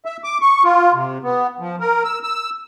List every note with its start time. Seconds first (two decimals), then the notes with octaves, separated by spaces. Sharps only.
0.05 E5
0.24 D6
0.41 C#6
0.64 F4
0.94 C3
1.24 B3
1.60 F3
1.80 A#4
2.04 E6
2.23 E6